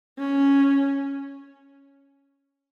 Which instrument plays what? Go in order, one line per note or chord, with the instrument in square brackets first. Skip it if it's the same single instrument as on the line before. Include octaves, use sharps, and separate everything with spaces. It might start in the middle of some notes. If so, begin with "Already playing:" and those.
[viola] C#4